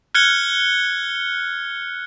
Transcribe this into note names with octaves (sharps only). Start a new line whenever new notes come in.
F6 F#6 G#6 C#7 G7